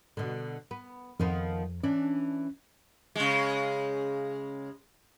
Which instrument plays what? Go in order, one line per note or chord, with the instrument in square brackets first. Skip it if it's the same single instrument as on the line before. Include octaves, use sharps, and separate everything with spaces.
[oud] B2 D3
B3
[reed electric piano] F2 [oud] D#3 F3 B3
[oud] E3 D4 [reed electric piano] C#4
[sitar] C#3 G#3